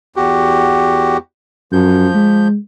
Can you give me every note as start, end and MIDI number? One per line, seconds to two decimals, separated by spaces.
0.16 1.17 40
0.16 1.17 66
0.16 1.17 67
1.72 2.09 42
1.72 2.48 53
1.72 2.48 91
2.15 2.56 56